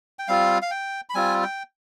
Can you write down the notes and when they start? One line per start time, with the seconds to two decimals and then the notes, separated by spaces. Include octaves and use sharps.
0.19 G5
0.28 G3 C4 F4 F5
0.62 F5
0.71 G5
1.09 B5
1.15 G3 C4 F4 G#5
1.43 G5